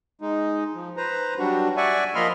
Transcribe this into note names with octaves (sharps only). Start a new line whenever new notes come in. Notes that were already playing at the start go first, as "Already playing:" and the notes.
G#3 D#4
F3
B4 C5 A#5
F#3 G3 D4 F#4
D5 E5 F#5 G#5 C#6
F3 A#3 D#5 B5 C6 F6